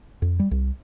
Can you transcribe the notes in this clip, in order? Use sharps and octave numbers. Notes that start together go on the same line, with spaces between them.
F2
G3
C2